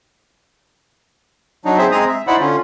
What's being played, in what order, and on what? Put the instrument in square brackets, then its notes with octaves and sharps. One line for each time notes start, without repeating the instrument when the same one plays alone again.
[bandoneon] F#3 D4 D#4
C4 G#4 C5 E5
G#3 C4 G#4 A#5 D#6
E5
D#4 E4 C5 D5 F#5 B5
D3 C#4 F4